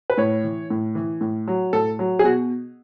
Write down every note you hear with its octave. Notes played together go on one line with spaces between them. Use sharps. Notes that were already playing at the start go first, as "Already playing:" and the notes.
B4
A2 C#5
E3
A2
E3
A2
F#3
A2 A4
F#3
G#4
B2 F#4